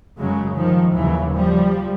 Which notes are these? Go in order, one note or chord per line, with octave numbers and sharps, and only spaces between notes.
F#2 C#3 F#3 G#3
D#3 F3
D#2 C#3 E3 F#3
F3 G3